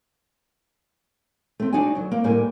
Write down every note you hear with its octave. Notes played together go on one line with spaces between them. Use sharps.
A3 C4
D4 D#4 F#4 D5 G#5
D2 F#3
A#3
D2 A2 G3 A#3 G#5